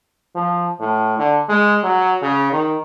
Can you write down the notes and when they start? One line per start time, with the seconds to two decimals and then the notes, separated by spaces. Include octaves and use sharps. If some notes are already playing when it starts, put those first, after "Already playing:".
0.35 F3
0.80 A2
1.18 D3
1.49 G#3
1.84 F#3
2.22 C#3
2.52 D#3